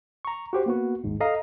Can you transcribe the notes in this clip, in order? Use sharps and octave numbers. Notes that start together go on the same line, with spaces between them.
A#5 C#6
F#4 G4 C5
A#3 B3 F#4
G#1 D#2 G#2
A4 D#5 F5 A#5